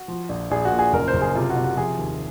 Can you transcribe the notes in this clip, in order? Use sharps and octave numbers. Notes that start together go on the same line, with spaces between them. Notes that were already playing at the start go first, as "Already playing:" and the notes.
Already playing: F#4
F3
A#1
A#1 G#4
F#4
A#2
G#4
F#1 A#4
C5
F#1
G#4
C3 F4
F#4
C3
F#4
F3 G#4
D#2